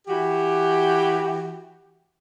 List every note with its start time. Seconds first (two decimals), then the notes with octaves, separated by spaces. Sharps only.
0.08 E3 F#4 G4